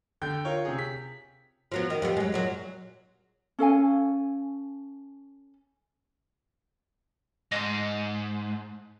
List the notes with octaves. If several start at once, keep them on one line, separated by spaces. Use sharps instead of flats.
D3 G5 G6
F4 A#4 C#5
C3 G#4
B6
F3 F#3 B3
D#3
F2 G3 B3
F#3 G#3
F#2 A#2 F#3
C#4 A4 F5 G#5
G#2 D#5 A5 C6